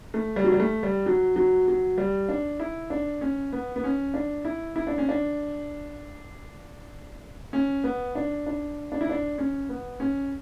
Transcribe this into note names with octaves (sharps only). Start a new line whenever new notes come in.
A3
G3
F#3
G3
A3
G3
F#3
F#3
F#3
G3
D4
E4
D4
C#4
B3
B3
C#4
D4
E4
E4
D4
C#4
D4
C#4
B3
D4
D4
D4
E4
D4
C#4
B3
C#4